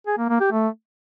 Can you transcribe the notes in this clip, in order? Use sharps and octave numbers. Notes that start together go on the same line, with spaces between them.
G#4
A#3
A#3
G4
A3